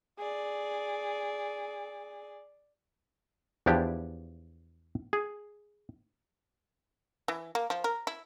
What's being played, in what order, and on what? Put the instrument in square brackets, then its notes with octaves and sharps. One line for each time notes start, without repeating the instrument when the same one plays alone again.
[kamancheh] G#4 D5
[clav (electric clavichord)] E2 F3 D4 E4 G4
G#4
[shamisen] E3
A#3
F3
A#4
E4